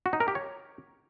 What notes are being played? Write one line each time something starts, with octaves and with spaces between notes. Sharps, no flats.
F#4
D#4
A#4
G4
C#5